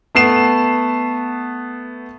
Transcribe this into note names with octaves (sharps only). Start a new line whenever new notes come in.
A3 B3 C7 E7